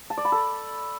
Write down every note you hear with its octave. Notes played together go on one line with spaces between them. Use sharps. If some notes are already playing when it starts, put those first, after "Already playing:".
A5
D5
B5
A4